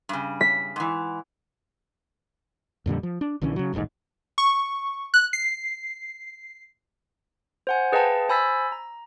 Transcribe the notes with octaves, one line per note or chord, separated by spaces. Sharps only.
G2 C#3
B6
G#2 E3
F2 A#2 D3 G3
F3
D4
A#1 D3 E3 C#4
C#3 F#3
D#1 A1 F2 G#2
C#6
F#6
C7
C5 F#5 G#5
G#4 B4 D#5 F5 G5 A5
C5 G#5 B5 E6 A6 B6
A#5